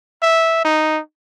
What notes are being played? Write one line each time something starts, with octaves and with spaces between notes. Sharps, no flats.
E5
D#4